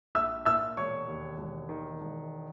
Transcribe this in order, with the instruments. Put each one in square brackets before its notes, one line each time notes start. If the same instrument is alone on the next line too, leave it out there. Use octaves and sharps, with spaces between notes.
[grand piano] A#1 E5 E6
A#2 E5 E6
E1 C#5 C#6
D#2
E1
D#3
E1